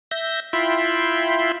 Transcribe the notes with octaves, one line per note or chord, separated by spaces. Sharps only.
E5 G6 A#6
E4 F4 E5 G5 B5 C6